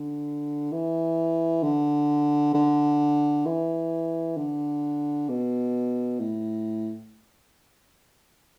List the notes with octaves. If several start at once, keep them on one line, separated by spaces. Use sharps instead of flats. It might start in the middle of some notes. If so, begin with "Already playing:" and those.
Already playing: D3
E3
D3
D3
E3
D3
B2
A2